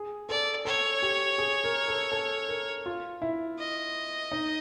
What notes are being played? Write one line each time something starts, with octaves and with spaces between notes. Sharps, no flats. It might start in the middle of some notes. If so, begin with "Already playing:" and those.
Already playing: G#4
A4 D5
A4 C#5
G4
G#4
A#4
A4
A4
A#4
F4
E4
D#5
D#4